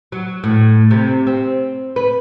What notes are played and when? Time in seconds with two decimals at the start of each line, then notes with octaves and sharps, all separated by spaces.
0.12 F#3
0.44 A2
0.91 C3
1.27 C4
1.96 B4